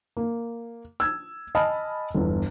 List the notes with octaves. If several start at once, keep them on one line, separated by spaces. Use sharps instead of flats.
A#3
E6 G#6
D#5 G#5 A5 B5 F6
G1 E2